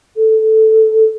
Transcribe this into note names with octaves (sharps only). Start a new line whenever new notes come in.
A4